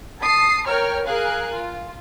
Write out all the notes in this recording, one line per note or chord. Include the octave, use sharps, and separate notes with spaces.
A5 D#6 C7
A#4 C#5 G5 A#5 F6
G#4 A#4 F5 G#5 F#6
F4